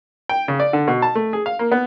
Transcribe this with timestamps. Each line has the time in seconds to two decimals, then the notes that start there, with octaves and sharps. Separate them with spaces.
0.29 G5
0.48 C#3
0.60 D5
0.73 D3
0.88 B2
1.02 A5
1.15 A3
1.33 G#4
1.46 F5
1.59 A#3
1.72 B3